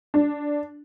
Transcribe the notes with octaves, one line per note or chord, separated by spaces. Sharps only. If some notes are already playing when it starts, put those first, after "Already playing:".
D4